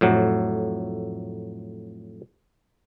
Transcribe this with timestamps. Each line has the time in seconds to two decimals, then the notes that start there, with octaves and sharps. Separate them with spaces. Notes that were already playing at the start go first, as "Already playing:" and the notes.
0.01 F2 A2 F#3